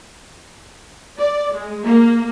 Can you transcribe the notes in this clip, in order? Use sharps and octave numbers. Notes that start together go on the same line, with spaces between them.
D5
G#3
A#3